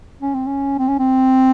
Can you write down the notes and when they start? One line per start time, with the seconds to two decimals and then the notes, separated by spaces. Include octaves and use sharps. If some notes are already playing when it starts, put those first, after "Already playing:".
0.21 C#4
0.34 C4
0.47 C#4
0.78 C4
0.88 C#4
0.99 C4